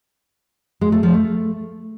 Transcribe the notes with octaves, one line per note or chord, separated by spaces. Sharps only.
G#3
A3
F3
A3